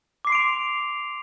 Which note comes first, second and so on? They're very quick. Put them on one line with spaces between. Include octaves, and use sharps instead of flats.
D6 C7 C6 D7 F7